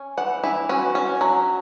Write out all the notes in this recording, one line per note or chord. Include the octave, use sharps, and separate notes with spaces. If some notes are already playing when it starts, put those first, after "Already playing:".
Already playing: C#4
E3 F#5
E3 E4
C#4 F#4
C#4
F#3